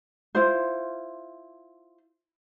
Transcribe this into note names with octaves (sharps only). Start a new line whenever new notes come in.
E4 F4 C5